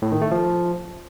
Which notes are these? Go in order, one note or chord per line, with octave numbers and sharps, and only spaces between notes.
A2
D#3
A3
F3